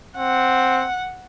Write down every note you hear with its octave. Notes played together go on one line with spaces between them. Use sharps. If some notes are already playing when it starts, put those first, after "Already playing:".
C4 F#5